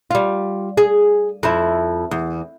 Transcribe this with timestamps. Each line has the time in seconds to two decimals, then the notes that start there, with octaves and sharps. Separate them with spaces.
0.11 G3 F4
0.77 G#4
1.43 F2 E4
2.11 E2